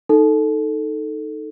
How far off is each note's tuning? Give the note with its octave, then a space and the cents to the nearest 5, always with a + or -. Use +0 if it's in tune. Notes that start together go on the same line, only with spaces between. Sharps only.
D#4 +0 A4 +0